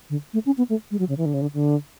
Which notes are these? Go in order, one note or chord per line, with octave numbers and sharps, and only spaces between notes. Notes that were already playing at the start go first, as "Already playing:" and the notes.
D3
A3
C#4
B3
A3
G#3
F#3
C#3
E3
D3
C#3
D3
D3